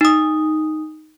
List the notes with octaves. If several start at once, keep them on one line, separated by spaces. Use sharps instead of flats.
D#4 D#6